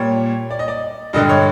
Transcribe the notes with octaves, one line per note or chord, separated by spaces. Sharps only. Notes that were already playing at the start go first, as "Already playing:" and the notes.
Already playing: A#2 G3 C#5
D5
D#5
D5
G2 D3 G3 D#5
C#5